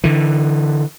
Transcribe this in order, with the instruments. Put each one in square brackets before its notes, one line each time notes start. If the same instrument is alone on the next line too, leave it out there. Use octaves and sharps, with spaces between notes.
[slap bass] D3 E3